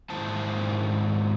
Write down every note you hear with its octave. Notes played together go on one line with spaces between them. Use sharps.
G#2 D#3 E4 C5 A5